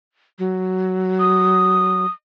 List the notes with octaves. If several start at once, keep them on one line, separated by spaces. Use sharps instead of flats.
F#3
D#6